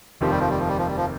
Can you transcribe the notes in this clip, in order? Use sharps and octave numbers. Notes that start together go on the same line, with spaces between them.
F1 D#2 D#3 F3 C4 G4
G3
F3
G3
F3
G3
F3
G3
F3